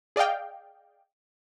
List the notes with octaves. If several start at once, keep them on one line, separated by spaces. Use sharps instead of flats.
G#4 D5 D#5 F5 G5